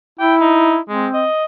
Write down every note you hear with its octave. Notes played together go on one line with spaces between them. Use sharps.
E4 G5
D#4
G#3 C4
D#5